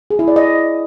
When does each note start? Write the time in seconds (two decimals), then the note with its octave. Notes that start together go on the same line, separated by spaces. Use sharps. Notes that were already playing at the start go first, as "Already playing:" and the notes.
0.10 G#4
0.19 E4
0.28 D5
0.36 D#5